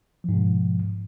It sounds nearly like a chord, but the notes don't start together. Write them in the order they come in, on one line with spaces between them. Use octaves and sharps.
F3 G#2 B2